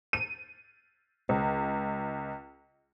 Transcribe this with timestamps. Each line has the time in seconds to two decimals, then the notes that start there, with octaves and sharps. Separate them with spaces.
0.13 D#7
1.29 C#2